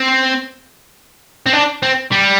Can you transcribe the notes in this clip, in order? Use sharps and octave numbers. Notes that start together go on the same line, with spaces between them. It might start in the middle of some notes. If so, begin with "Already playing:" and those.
Already playing: C4
C4
D4
C4
G3